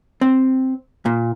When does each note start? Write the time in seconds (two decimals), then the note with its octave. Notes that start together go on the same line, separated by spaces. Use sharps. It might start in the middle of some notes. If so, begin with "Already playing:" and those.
0.21 C4
1.06 A#2